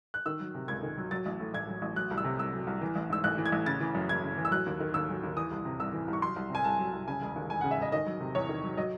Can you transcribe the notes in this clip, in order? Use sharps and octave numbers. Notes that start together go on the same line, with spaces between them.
F#6
D#3 E6
F#3
C3
C#2 G#6
D#3
F#3
F#3 A6
A1
A2
A1 G#6
F#3
A1
F#3 F#6
C2
E6
C3
C2 E6
F#3
C2
E3
A1
G#2 E6
A1 F#6
E3
G#6
A1
C#3 A6
E3
F#2
F#1 G#6
C#3
E3
E6
F#3 F#6
D#2
D#3
D#2 E6
F#3
D#2
E3 D#6
C2
C3
C2 E6
E3
C2
C#6
F#3 C6
C2
C3 G#5
C2 A5
F#3
C2
C#3 G#5
E1
D#2
E1 G#5
C#3 F#5
E5
E1 D#5
D#3 D#5
F#3
C3
E2 C#5
D#3
F#3
F#3 D#5